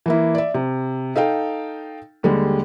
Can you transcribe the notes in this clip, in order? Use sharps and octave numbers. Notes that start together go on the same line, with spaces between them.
E3 A#3 E4
D5 E5
C3
D#4 A4 F5 G5
D#2 D3 G3 G#3